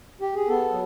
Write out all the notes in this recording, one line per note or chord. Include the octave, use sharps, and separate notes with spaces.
G4
G#4
B3 A4
F#3